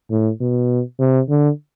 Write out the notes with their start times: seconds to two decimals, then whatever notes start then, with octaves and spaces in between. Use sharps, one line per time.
0.11 A2
0.41 B2
1.00 C3
1.29 D3